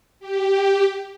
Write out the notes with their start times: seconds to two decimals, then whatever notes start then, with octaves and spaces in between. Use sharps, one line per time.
0.20 G4